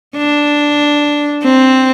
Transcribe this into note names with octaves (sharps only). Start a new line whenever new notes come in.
D4
C4